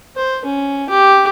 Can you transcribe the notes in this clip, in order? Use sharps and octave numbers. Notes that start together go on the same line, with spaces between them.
C5
C#4
G4